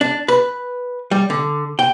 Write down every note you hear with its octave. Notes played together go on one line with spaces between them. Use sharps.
D4
B4
G3
D3
G5